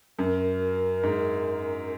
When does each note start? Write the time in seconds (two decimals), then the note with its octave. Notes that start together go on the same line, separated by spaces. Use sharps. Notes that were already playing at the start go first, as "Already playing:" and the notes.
0.19 F#2 A#4
1.03 G#2